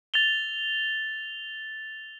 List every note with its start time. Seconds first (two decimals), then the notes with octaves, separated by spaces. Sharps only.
0.14 A6 F7 G7